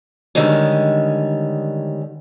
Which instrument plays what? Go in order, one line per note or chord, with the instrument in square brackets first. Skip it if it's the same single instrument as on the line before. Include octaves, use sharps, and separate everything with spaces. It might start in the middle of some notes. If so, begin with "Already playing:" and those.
[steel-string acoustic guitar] D3 D#3 G3 G#3 C#4